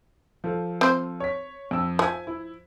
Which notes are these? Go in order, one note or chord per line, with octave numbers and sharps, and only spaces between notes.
F3 A4
C4 C5
C#5 B6
F2 E6
F3 E5 G#5 G#6
E4